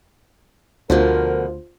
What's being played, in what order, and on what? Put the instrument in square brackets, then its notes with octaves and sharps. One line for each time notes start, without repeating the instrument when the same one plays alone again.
[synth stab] D2 [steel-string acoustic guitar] B2 D3 F3 [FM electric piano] F4 C5 [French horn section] A#4